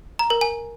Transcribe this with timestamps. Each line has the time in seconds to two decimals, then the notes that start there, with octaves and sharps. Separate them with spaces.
0.19 A#5
0.30 A#4
0.41 G#5